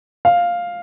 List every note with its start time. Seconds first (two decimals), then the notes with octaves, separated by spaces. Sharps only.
0.25 F5